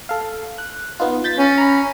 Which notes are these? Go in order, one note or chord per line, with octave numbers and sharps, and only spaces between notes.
A4 F5
F#6
B3 D#4 F4
G6 A6 B6
C#4
A#5 B5